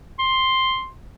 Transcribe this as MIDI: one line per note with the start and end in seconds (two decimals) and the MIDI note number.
0.19 0.89 84